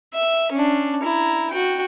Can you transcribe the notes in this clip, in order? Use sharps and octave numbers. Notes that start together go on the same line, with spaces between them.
E5
C#4 D4
E4 A#5
F#4 G5